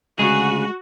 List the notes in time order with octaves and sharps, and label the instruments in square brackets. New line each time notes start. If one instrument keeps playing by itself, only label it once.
[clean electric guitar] D2 C#3 G#4 [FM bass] G#3 [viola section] F#4